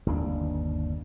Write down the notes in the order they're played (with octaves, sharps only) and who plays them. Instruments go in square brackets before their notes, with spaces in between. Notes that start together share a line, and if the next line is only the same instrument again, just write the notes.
[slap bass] G1 D#2 B2 D4